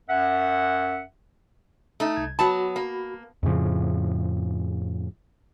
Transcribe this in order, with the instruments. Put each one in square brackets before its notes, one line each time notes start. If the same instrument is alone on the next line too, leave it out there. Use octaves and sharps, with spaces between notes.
[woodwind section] F#2 E5 F#5
[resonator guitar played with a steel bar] A3 D#4
[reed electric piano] C2 G#6
[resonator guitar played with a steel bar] F#3 B3 A5 [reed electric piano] F#4 B5
[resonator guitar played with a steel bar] A#3
[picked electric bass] F2 A2 C#3 F3